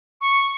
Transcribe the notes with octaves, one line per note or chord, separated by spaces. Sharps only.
C#6